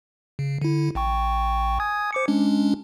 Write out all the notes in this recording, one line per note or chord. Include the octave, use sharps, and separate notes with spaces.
C#3
D3 E4
A1 G5 C#6
G#5 D#6 G#6
C5 D6 C#7
G#3 C#4 D4